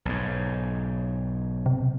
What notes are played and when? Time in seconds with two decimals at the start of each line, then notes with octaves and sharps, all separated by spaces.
0.05 B1 G#2
1.66 C3